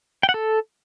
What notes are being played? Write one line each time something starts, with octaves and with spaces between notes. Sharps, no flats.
G5
F#5
A4